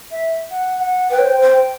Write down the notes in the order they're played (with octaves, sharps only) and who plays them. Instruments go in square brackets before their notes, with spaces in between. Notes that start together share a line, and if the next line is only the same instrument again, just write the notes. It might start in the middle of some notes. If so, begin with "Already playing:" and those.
[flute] E5
F#5
F#5
[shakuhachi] B4 [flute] G5
[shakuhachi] C#5
C5
[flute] G5
[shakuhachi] C5
[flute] G5